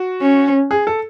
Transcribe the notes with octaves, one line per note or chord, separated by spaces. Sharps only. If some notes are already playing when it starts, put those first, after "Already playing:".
Already playing: F#4
C#4
G#4
A4